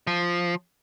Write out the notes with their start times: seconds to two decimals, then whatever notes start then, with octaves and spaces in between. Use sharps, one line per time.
0.07 F3